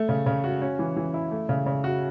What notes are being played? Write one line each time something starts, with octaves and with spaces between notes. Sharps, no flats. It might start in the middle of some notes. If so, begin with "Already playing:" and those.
Already playing: A3
C#3
C#3
F#4
C#4
E3
E3
E4
A3
C#3
C#3
F#4